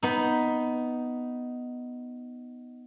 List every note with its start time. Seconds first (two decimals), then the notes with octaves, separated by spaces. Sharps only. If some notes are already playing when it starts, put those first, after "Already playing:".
0.03 B3 D#4